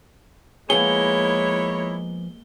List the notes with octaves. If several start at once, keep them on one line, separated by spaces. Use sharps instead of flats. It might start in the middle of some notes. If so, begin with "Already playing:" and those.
F3 G#3 A#3 B3 E4 G#4 C#5 G7